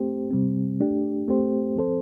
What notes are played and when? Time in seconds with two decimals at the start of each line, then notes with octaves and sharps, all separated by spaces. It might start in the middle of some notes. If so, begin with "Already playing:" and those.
Already playing: A3 C4 G4 C5
0.31 C3 G3 C4
0.80 A3 D4 G4
1.28 A3 C4 G4 C5
1.76 F3 C4 A4 C5